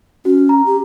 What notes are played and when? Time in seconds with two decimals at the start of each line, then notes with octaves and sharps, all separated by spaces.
0.25 C#4 F#4
0.49 A#5
0.66 G4